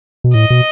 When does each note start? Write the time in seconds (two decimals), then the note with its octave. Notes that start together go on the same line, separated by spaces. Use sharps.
0.24 B2
0.34 A2 D#5
0.50 B2